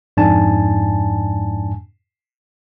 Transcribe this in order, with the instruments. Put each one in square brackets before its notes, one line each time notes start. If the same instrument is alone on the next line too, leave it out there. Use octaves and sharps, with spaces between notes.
[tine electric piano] F2 G#2 D4 G#5 A5